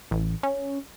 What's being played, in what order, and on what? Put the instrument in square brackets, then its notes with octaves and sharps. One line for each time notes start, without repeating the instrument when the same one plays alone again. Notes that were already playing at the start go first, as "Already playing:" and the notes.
[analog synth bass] A1
C#4